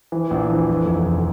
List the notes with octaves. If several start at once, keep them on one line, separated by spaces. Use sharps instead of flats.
E3
A#1
E3
F2
F1
F1